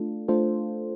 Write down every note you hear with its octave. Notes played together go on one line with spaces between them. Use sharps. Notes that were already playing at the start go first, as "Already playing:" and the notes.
Already playing: A3 D4 F4 A4
A3 D4 F4 A4 C5